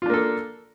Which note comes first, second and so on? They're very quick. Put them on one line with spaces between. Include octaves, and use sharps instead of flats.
F4 D4 A#3 A4